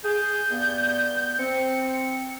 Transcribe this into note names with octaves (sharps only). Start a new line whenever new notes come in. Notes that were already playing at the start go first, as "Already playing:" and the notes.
G#4 G6
G2 B3
C4 C#7